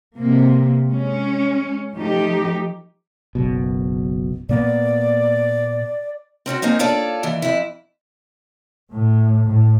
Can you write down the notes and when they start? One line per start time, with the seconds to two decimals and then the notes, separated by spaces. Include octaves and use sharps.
0.16 C3 A#3
0.86 G#3 C#4
1.95 F3 A3 D#4 G4
3.35 F#1 B1 B2
4.49 A#2 A#3 B3 D5
6.46 C4 C#4 F4 F#4
6.62 A#3 C4 C#4 D#4
6.79 D4 F4 A4 C#5 D5
7.23 D#2 E3 D5
7.42 F2 E4
8.91 A2
9.47 A2